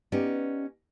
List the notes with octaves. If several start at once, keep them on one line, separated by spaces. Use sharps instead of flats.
B3 C#4 D#4 G4 D5